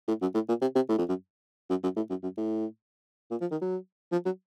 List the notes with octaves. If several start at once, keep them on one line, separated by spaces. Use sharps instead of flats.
A2
F#2
A2
A#2
C3
C3
A2
F2
F#2
F#2
F#2
A2
F#2
F#2
A2
A#2
F3
D#3
F#3
F3
F#3